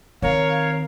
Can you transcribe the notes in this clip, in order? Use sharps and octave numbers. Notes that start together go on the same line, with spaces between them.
D#3 C4 A#4 C#5 F5